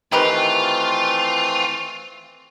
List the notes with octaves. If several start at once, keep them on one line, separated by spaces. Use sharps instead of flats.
D#3 E3 A3 C4 F4 G4 B4